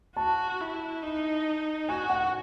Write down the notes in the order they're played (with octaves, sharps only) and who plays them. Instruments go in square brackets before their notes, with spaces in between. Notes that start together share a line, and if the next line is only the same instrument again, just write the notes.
[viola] F#4 [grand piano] A5
[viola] E4
D#4
[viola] F#4 [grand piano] G#5
[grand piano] F#5